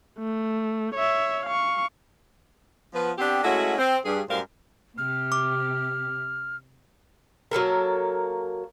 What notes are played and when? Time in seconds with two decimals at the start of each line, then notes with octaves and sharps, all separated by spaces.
0.19 A3
0.94 C#5 E5
1.46 F5 C#6
2.93 F3 B3 B4
3.18 B3 C4 D4 G4
3.43 G#3 A3 C#4 E4 F#4
3.78 C4
4.05 G2 G#4
4.29 F#2 A2 G3 A#4 C5 F5
4.98 C3 G4 F6
5.32 D6
7.51 F#3 A#3 A4 A#4